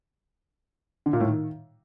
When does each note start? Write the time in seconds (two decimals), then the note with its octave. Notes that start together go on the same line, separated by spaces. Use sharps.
1.06 D3
1.13 A#2
1.20 A2
1.27 D#3